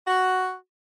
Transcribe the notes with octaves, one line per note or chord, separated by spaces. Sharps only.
F#4